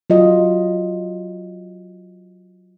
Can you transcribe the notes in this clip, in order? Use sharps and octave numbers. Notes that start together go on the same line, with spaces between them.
F#3 F4 D#5